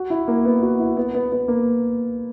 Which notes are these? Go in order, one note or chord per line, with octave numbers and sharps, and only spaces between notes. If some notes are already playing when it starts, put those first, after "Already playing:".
Already playing: F#4
E4
A#3
B3
F#4
E4
B3
B3
B3
A#3